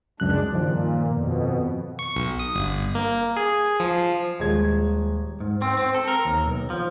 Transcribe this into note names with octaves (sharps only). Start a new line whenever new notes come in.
C#2 F#2 G#3 D4 F#6
G2 A#2 D#3 F3
F2 B2
C#6
B1
D#6
G1
A#3
G#4
F3
F3
D#1 G#3 G#6
G#2
C4
C4
A4
A#4
D#2
B1
F3